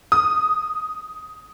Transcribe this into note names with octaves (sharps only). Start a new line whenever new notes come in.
D#6